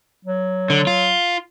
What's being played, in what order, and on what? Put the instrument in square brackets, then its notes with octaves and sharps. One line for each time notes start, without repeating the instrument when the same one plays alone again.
[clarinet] F#3
[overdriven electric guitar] D3
F4